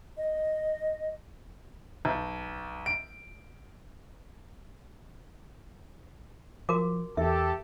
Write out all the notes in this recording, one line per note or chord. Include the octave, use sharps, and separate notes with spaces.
D#5
B1
D7
F3 F#4 A#4 D6
E2 G4 A4 E5